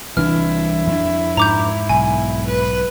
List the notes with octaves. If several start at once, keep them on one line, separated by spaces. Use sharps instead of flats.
C2 E3 D4 E4 F6
F2 D4
G#2 A#5 D6 G6
B1 G#5
B4